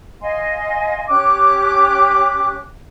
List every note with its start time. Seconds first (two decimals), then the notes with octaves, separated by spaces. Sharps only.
0.21 D#5 F5 G#5 C6
1.08 C#4 G4 D6 F#6